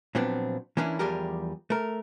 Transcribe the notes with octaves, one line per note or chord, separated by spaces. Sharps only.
A#2 F3 F#3 B3 C4 D4
E3 A#3 C#4 D4 E4
E2 F3 G3 G4 G#4 A#4
A3 A#4